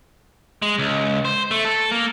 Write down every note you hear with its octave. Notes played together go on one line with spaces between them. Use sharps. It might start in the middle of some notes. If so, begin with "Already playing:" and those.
G#3
C#2
C5
A3
A4
A#3